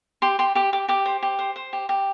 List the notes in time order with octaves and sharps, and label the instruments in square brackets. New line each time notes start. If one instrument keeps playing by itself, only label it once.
[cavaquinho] G4 C6
G4 C6
G4 D6
G4 D6
G4 D6
C5
G4
C5
C5
G4
G4